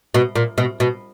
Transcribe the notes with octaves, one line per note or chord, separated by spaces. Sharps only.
B2
A#2
B2
B2